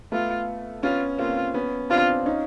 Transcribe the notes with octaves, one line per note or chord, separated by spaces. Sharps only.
A3 B3 F4
B3 C#4 F4
A#3 C4 F4
B3 C#4
C4 D4 F4
C#4 D#4